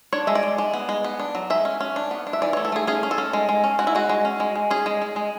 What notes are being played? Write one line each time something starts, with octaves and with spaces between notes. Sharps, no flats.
D4 C#5
G#3 E5
D5
G#3
G#3
B3
G#3
B3
D4
F#3
G#3 E5
C#4
C#4
D4
B3
D4
E5
E3 D5
C#5
A3
A4
A3 G#4
C#4 G#4
C#4
A4
C#4
G#3
G#3
C#4
G#3 F#4
E4
G#3 F#4
G#3
C#4
G#3
G#3
C#4 G#4
G#3
G#3
G#3